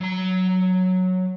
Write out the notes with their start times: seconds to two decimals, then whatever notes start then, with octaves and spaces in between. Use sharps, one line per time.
0.01 F#3 A#5